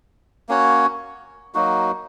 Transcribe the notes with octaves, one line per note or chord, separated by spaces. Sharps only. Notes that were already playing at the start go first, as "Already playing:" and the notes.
A#3 C#4 F#4 C#5
F#3 A#3 D#4 F#4